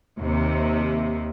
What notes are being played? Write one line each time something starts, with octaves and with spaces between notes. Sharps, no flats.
D#2 C3